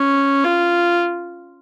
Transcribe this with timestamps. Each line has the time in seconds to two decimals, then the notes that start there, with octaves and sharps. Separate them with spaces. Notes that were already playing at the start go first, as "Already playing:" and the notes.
Already playing: C#4
0.44 F4